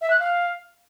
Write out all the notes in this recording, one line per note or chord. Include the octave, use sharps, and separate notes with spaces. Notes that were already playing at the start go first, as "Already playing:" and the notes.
E5
F#6
F5